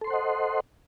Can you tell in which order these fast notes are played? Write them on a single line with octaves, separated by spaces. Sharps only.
A4 C6 C5 F#5 D#5